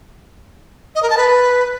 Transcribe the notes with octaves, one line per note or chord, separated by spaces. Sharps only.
D#5
A#4
A5
B4